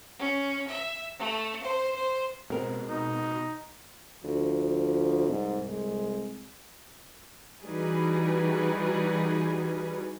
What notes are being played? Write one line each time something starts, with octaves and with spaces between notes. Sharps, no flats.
C#4
E5
A3
C5
C5
B2 G#3 C4 A#4
D#4
D2 F3
C2 G#2
G#3
E3 G3 D#4 F#4 G#4 B4